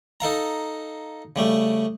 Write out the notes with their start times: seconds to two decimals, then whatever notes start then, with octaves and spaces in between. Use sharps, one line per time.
0.20 D#4 A4 F5 A#5
1.36 C#3 G3 A3